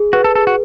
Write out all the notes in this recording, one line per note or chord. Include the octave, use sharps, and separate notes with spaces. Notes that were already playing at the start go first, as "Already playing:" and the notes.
Already playing: G#4
F#4 B4
A4
G#4 A4
F#4